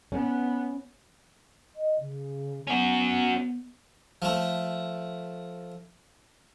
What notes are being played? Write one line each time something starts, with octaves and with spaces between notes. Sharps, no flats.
B3 C#4
D#5
C#3
B3 C#4 F#4
F3 A3